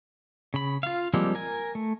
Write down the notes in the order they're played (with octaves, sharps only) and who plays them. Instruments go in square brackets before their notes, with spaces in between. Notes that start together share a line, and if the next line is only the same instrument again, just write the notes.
[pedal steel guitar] C#3 B5
F4 F5
F3 G3 G#3 A#3 C4
A#4 G#5
A3